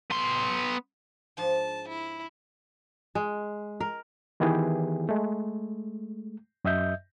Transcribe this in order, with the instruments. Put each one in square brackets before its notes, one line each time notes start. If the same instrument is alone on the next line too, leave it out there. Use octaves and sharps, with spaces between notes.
[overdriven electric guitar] B3 C6
[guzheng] G#2 F3 D4 [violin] A5
[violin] E4
[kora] G#3
A#4
[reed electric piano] D#3 E3 B3 E4 G4 G#4
G#3 A3
F#2 D#5 E5 G6